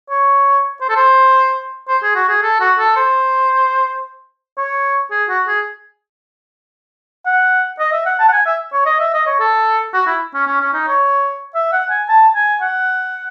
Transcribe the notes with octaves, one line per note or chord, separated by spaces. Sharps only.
C#5
C5
A4
C5
C5
G#4
F#4
G#4
A4
F#4
A4
C5
C#5
G#4
F#4
G#4
F#5
D#5
E5
F#5
A5
F#5
G#5
E5
C#5
D#5
E5
D#5
C#5
A4
F#4
E4
C#4
C#4
C#4
D#4
C#5
E5
F#5
G#5
A5
G#5
F#5